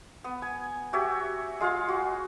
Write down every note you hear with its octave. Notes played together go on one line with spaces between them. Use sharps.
B3
G#5
F#4 G4 C#5 E5
G#3 F4 G#4 F5
F#4